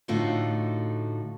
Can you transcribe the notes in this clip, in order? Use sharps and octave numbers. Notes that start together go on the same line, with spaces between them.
A2 D3 A3 D#4 F4 F#4